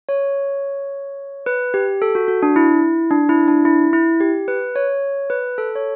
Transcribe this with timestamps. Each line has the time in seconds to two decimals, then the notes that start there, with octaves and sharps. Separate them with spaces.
0.09 C#5
1.46 B4
1.74 G4
2.02 A4
2.15 F#4
2.28 F#4
2.43 D4
2.56 E4
3.11 D4
3.29 E4
3.48 D4
3.65 E4
3.93 E4
4.20 G4
4.48 B4
4.76 C#5
5.30 B4
5.58 A4
5.75 C#5